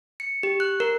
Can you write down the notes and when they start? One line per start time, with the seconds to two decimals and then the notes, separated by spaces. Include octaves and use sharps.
0.20 C#7
0.43 G4
0.60 F#6
0.80 A#4